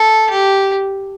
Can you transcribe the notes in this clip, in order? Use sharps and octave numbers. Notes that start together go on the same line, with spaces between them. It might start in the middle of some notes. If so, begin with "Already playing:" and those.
Already playing: A4
G4